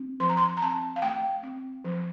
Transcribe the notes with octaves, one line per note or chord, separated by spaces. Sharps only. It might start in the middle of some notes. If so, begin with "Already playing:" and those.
Already playing: C4
F3 C6
A#5
C6
A#5
C4 A5
F5
A3 G5
C4
F3